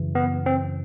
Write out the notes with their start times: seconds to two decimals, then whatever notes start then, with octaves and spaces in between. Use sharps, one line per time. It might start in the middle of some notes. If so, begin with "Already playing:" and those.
Already playing: F#2 C#3 E3
0.15 B3
0.46 C4